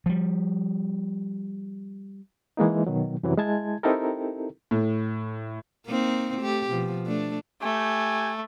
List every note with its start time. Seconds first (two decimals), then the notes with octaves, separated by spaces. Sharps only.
0.06 F3 G3
2.57 E3 G#3 A#3 D#4
2.87 B2 D#3 F#3
3.23 F#2 C3 E3 F#3
3.38 G#3 E4 A5 G#6
3.83 C4 D#4 E4 G4 A4 A#4
4.71 A2
5.87 A#3 C4 D#4
6.40 A3 G4
6.70 B2 F3
7.07 A3 D4
7.62 A3 G4 G5 G#5